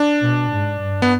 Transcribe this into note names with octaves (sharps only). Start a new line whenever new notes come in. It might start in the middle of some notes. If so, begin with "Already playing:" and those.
Already playing: D4
B2
G#2
G2
B3